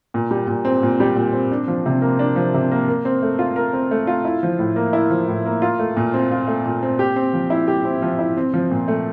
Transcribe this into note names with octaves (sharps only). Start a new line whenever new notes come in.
A#2
G3
A#2
C4
A#2
G3
A#2
C4
D4
F3
C3
A#3
D4
F3
C3
A#3
A#4
C4
A3
F4
A#4
C4
A3
F4
E4
F3
A2
A#3
E4
F3
A2
A#3
F4
A3
A#2
C4
F4
A3
A#2
C4
G4
C4
F3
E4
G4
C4
F3
E4
C4
F3
A#2
A3